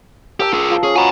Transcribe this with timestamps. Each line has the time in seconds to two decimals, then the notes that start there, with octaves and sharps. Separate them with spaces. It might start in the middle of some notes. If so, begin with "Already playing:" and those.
0.40 G4 A#4 A5 E6
0.53 F4 G#4
0.70 F3 A5 C6
0.83 C#4 G#4
0.95 F#4 B4 D#5 G#5 A#5